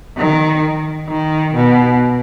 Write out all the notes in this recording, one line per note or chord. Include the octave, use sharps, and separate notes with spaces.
D#3
D#3
B2